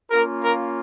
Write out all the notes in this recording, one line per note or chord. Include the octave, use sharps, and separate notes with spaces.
A#3 C#4 F4 A#4
A#4